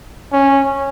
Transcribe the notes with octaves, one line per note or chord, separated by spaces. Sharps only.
C#4